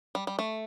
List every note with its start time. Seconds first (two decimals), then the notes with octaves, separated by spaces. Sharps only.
0.15 G3
0.27 G3
0.39 A3